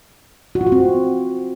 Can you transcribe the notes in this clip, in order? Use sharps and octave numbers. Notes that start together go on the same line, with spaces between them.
F#4
F4
F#4
C4